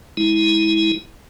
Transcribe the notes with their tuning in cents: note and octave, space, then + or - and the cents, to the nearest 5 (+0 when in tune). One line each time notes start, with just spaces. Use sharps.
G#3 +0 E4 -25